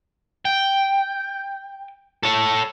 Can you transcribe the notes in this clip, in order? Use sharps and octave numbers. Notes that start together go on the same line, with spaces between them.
G5
A4 C#5